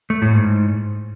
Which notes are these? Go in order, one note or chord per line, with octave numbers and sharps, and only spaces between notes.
A3
A2
G#2